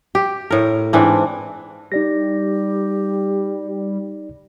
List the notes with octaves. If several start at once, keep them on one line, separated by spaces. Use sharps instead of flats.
G4
A2 A#4
G#2 E3 C4 D4
G3 D#4 G4 D5 A#6